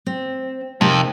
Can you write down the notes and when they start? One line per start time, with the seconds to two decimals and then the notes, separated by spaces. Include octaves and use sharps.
0.06 C4
0.81 F2 C3 D#4 A#4